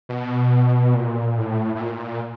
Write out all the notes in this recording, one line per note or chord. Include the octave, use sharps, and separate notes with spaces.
B2
A#2
A2
A2
A#2